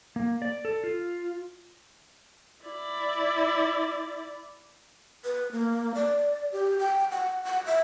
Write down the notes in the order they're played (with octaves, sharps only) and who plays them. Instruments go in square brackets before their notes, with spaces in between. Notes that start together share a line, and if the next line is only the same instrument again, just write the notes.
[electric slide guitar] A#3
D5
A4
F4
[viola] E4 D5
[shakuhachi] B4
A#3
D5
G4
G5
F#5
F#5
E5